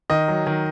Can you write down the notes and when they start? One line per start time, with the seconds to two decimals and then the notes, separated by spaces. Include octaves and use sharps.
0.10 D#3 D#5
0.28 F#3
0.47 D#3